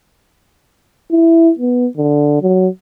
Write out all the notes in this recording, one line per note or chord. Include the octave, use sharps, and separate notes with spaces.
E4
B3
D3
F#3